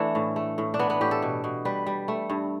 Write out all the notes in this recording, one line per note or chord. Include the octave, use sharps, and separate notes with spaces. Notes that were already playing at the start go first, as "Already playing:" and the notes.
Already playing: E3 A3 D4 E4
A2
A3
A2
D4
E3 B3
B3
A2 G4
A4
B2
B2
G3 B4
G3
A3
G2